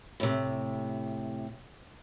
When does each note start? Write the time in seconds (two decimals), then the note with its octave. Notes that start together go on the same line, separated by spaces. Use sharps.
0.20 A2 C3